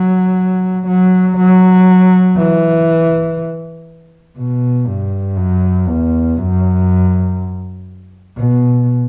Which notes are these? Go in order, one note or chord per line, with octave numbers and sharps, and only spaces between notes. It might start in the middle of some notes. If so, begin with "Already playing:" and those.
Already playing: F#3
F#3
F#3
E3
B2
G2
F#2
E2
F#2
B2